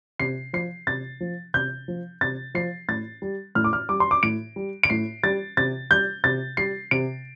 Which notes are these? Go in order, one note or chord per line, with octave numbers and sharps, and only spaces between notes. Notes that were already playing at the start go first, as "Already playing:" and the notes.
C3 C7
F3 C7
C3 A6
F3
C3 G6
F3
C3 A6
F3 C7
A2 A6
G3
A2 F6
D6
F6
G3 D6
C6
D6
A2 D7
G3
D7
A2 C7
G3 A6
C3 A6
G3 G6
C3 A6
G3 C7
C3 D7